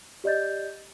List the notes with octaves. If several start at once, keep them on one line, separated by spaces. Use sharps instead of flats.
G4 D5 D#5 G6 A6